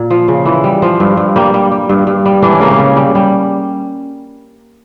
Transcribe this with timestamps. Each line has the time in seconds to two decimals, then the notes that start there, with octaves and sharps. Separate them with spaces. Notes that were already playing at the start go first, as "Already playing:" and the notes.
Already playing: A#2
0.10 F3
0.28 C#3
0.46 E3
0.64 G3
0.82 F3
1.00 G2
1.17 G2
1.36 G3 A#3
1.54 G3
1.72 G3
1.89 G2
2.07 G2
2.26 G3
2.42 E3 D4
2.53 C#4
2.60 C#3 A#3
2.71 C#4
2.79 C#3
2.96 G3
3.15 G3